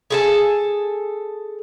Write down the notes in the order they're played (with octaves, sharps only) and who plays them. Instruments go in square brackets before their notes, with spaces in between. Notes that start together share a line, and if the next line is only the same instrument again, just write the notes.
[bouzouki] G#4 A4 A5